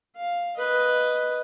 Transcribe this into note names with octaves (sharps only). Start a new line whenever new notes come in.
F5
B4 D#5